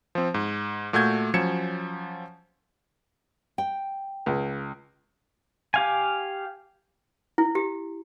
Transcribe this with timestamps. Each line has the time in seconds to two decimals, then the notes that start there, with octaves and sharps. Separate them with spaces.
0.15 F3 C4
0.34 G#2
0.93 A#2 A3 F#4 G6 G#6
1.34 F3 F#3 C#4 G#6 C#7 E7
3.58 G5
4.26 C#2
5.74 G4 F5 G#5
7.38 E4
7.55 G4